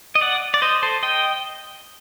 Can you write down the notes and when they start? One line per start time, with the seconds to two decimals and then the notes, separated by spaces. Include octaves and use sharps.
0.15 D#5
0.21 D5 F#5
0.54 D5
0.62 C5 D#5
0.83 A4 C5
1.03 D#5 G5